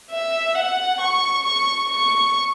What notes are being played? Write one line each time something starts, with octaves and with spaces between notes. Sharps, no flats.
E5
F#5
C#6
C#6
C#6